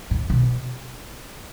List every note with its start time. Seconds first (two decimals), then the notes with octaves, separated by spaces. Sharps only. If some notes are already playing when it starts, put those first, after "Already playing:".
0.11 A2
0.30 B2